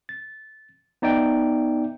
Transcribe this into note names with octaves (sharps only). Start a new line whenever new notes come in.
A6
B3 D#4 D5 E5 G5